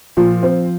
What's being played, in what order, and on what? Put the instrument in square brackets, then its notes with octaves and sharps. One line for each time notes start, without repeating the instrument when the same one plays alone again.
[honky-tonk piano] A#2 [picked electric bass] F3
[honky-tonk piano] C4